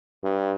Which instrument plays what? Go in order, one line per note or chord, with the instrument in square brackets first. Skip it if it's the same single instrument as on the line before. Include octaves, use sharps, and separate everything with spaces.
[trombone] G2